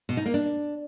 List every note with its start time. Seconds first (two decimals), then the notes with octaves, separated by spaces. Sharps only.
0.09 B2
0.17 D#4
0.26 A#3
0.34 D4